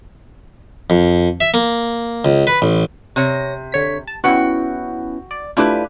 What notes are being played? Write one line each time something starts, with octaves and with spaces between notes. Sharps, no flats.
F2
E5
A#3
C#2
B4
A1
C3 C#5 A#6
D3 C#5 B6
A5
B3 C#4 E4 F#4 F#5 G5
D5
A3 D4 E4 F4 G4 B4